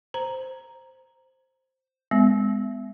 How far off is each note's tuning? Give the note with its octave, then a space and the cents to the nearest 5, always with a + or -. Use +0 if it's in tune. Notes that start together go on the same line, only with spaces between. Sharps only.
C5 +0 A#5 +0
G#3 -15 B3 +30